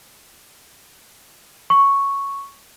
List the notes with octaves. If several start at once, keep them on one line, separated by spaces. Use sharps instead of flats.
C#6